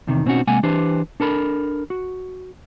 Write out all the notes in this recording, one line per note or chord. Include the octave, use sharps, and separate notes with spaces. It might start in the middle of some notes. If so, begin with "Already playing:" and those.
E2 C3 D#3
B2 C4 C#4 D#4 F#4
C3 G#3 A#3 F#5 G#5
E3 D4 G4 B4 C5
D4 A4 A#4 B5
F#4